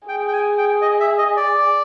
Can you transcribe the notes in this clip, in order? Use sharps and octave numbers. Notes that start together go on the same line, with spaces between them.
G#4 G5
G5
G#5
G5
D#5
E5
D#5
D5